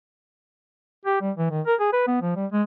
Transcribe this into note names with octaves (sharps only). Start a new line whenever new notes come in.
G4
G3
E3
D#3
A#4
G#4
B4
B3
F3
G3
G#3